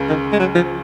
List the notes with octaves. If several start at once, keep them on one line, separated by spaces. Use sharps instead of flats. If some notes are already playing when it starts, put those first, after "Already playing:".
Already playing: C#2 C#3
D#3
G#3
F#3
F3